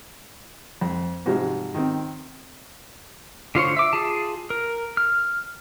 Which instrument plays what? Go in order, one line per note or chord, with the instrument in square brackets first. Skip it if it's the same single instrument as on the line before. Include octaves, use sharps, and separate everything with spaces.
[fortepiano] F2
G#2 C3 F3 F#3
D#3 C4
[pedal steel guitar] D3 F4 C5 C#5
E5 D6
F4 G#4 A5
A#4
F6